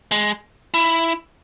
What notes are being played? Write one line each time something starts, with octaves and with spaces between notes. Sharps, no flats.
G#3
E4